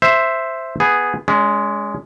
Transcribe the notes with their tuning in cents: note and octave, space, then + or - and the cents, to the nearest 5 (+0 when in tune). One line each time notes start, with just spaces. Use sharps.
C5 +0 E5 +5
B3 +0 G#4 +0
G#3 +0 C#4 +40